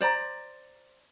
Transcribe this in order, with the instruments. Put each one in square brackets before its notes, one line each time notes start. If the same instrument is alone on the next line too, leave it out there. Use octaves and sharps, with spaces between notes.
[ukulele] C5 D5 A#5